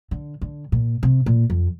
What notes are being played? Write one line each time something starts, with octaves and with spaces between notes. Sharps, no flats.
D3
D3
A#2
C3
A#2
F2